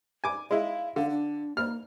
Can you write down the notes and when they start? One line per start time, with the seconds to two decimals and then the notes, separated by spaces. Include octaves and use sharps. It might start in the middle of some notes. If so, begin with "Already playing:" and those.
0.24 G#5 D6
0.51 G#3 E4 F5
0.96 D3 F5
1.10 D4
1.57 A#3 F6